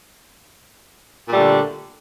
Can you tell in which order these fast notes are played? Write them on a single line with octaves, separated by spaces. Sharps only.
A#2 G3 A3 D3